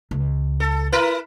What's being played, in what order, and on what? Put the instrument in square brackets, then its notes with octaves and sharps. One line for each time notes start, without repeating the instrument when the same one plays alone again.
[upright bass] C#2
[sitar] A4
E4 A#4 B4